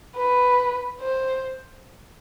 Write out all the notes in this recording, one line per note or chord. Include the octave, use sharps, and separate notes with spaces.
B4
C5